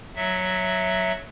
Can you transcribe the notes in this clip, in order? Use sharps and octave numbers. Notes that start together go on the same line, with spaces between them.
F#3 E5